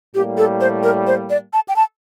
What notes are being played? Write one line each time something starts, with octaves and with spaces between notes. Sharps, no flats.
A2 G3 A#3 G4
A4
C5
A#4
C5
D5
A5
G5
A5